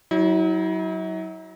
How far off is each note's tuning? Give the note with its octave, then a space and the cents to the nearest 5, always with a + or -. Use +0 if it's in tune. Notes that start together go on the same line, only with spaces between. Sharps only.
F#3 +15 E4 -40